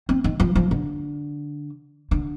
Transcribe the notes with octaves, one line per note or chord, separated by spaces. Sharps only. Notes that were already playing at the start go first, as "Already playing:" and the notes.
C4
D#3
F3
F3
D3
D3